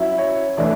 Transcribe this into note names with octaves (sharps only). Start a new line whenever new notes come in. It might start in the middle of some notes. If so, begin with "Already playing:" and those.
Already playing: F#3 C#4 E4
C#5
E3 A3 D4 D5